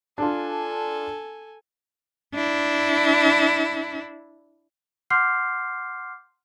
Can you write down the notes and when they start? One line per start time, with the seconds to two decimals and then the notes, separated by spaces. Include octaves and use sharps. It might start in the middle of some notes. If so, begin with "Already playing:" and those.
0.18 D4 F4 A4 G#5
2.35 D4 E4
5.10 F#5 C6 D6 F6 G6 C7